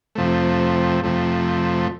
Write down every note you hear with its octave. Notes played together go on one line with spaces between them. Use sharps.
F2 C3 F3 A3
F2 C3 F3 A3